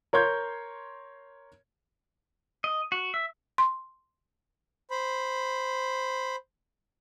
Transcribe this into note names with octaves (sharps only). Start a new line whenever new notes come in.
A#4 C#5 C6 G6 G#6
D#5
F#4
E5
C6
C5 B5